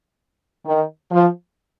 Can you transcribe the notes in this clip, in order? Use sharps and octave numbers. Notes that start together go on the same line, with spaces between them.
D#3
F3